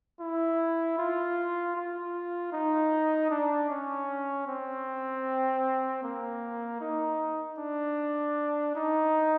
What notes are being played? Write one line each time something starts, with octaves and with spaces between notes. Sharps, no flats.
E4
F4
F4
D#4
D4
C#4
C4
A#3
D#4
D4
D#4